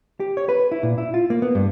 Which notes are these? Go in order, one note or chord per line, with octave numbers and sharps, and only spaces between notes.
G4
C#5
B4
E4
A#2
E4
F4
A#3
B3
G2